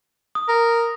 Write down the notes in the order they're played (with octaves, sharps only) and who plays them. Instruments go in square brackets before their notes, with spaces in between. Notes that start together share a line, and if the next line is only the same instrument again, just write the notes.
[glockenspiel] D#6
[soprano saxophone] A#4